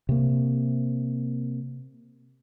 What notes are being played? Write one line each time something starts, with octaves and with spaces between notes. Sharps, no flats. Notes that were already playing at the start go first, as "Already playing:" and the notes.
C3 A#3